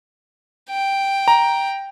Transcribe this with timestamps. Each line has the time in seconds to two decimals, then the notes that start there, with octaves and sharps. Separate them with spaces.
0.70 G5
1.28 A#5